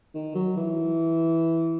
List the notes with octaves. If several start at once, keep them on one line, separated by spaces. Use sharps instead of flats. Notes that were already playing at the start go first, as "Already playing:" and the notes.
D#3
F#3
E3